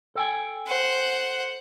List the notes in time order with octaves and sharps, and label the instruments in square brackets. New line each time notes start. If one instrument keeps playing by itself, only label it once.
[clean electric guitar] A4 G5 G#5
[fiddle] C5 F#5